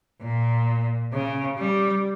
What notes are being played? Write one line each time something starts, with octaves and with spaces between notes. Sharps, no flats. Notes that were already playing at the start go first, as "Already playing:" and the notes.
A#2
C#3
G3